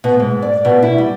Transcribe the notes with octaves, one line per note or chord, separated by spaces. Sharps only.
B2
G#2
D5
B2
E4
G3